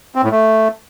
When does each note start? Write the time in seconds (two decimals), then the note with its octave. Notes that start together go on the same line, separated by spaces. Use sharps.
0.15 C4
0.23 A2
0.31 A3